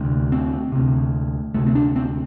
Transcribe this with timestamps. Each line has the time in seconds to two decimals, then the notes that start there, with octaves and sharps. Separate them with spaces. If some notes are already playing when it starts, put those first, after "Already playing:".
Already playing: D2 C3
0.32 C4
0.72 D2 C3
1.54 D2 C3 A3
1.66 C4
1.75 D4
1.96 C4